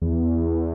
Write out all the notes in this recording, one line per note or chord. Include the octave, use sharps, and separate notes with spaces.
E2